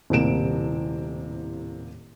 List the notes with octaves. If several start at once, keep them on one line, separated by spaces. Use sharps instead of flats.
D#1 A2 C3 A#3 D7 E7